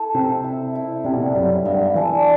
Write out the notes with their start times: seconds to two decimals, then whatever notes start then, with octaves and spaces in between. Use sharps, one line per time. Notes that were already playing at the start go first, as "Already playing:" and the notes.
Already playing: E4 A4
0.14 C3 C5
0.44 E4
0.75 E4
1.04 C3 G3
1.13 B2
1.22 C3
1.35 F#2 G3
1.65 G2 B3
1.95 E3 D4